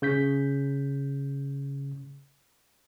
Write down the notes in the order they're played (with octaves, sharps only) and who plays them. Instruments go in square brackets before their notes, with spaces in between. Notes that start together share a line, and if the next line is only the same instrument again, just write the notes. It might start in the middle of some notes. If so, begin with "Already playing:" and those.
[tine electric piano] C#3 G6 B6